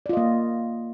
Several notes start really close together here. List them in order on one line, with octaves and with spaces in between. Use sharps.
D5 F4 D#5 A#3